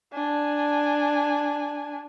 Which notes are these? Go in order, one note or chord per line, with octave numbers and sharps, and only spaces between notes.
D4 G#5